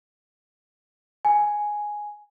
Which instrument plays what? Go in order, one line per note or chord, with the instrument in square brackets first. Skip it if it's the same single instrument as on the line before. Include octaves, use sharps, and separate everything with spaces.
[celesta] G#5